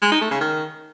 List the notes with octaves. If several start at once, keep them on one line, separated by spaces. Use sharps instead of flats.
G#3
D#4
A3
C#3
D#3